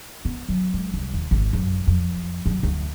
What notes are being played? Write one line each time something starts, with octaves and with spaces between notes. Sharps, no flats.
B3
F#3
G#3
C2
D#2
G#1
F#2
F2
F#2
D2